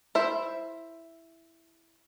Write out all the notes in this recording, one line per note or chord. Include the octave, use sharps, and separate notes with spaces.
E4 C5 E5